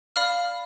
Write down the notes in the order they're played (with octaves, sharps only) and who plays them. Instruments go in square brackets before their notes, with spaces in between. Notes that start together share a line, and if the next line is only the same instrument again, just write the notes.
[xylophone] D5 F5 B5 F6